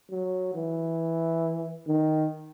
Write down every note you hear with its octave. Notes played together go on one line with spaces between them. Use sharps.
F#3
E3
D#3